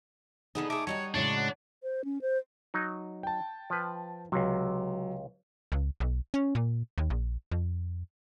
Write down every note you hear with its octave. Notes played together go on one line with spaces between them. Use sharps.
D3 B3 D#4 G#4 A4
A3 G#4 D6
G3 D#4 E4 F#4 C#5
A2 C#3 G#3 D4 C#6
F#5
C5
C#4
C5
F#3 D#4
G5 A5
F3 B4
C#2 C3 F#3
C#2
B1
C#4
A#2
D#2
A#1
F2